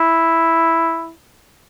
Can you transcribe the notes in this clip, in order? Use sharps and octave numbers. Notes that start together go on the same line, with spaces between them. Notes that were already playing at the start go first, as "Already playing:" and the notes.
Already playing: E4